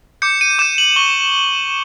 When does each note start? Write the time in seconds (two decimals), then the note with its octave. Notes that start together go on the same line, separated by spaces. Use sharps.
0.22 D6 G6 C#7
0.41 D#7
0.59 D6 G6 E7
0.78 F#7
0.96 C#6 G7